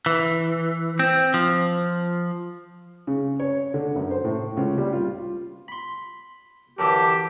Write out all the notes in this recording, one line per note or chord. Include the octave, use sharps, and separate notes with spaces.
E3
C4
F3
C#3
C#5
D3
F#2
C5
A2
C#2
G3
F4
B5 C6
F#2 D3 E3 G4 A5